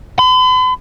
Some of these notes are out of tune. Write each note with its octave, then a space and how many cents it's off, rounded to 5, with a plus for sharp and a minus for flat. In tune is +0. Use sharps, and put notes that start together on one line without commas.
B5 +45